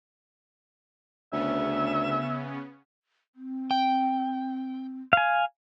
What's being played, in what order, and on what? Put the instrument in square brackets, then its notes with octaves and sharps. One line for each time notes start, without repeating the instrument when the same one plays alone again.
[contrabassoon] D2 [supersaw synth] C#3 B3 C#4 [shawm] E5
[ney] C4
[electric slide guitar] G5
[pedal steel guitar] F5 G#5